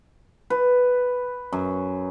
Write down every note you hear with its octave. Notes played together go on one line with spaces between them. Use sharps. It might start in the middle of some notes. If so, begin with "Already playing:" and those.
B4
F#2